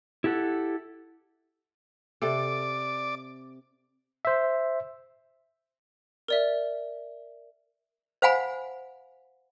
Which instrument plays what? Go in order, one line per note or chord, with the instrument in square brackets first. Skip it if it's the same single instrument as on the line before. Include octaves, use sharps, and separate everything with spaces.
[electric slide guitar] E4 G4 A4 F#5
[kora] C3 A4 [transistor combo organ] D5
[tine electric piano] C5 E5
[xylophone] A#4 D5 E5
[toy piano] C5 F5 F#5 G#5 B5